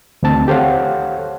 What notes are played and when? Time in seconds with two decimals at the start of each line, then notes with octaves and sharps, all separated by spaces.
0.23 D2 D#3 C4 A5
0.48 G4 A4 C5 C#5 F5 F#5